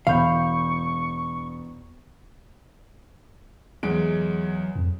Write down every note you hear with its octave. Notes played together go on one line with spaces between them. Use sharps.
E1 F5 B5 C#6 G6
E2 F#3 G#3 D7
F2